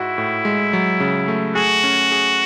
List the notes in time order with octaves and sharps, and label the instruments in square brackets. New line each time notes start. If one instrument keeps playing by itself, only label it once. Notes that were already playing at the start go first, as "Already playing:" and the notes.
Already playing: [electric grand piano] G#2 F#4 [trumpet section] E4
[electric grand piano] A2
G#3
F#3
C#3
A3
[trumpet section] F#4 [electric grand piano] G#4
[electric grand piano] C#4
G#4